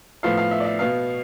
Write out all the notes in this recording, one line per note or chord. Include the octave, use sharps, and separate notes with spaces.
A2 F3 B3 F5
F5
E5
D5
E5
B2 B3 F5